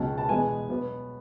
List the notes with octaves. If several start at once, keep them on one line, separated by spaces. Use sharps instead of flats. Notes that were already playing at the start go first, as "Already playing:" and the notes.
Already playing: C#2 B2 F#3 A5
A5
E2 B2 G#3 B3 G#5
B2 F#3 B3